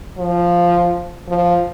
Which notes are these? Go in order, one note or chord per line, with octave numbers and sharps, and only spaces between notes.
F3
F3